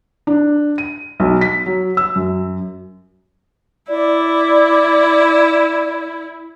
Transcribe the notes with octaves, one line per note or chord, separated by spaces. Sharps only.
D4
D#7
B1
B6
F#3
E6
F#2
E4 D5